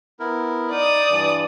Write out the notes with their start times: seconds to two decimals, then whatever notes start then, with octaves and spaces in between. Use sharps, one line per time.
0.20 B3 E4 A#4
0.71 D#4 D5 D#6
1.10 G2 E3